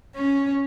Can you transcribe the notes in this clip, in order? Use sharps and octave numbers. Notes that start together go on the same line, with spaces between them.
C#4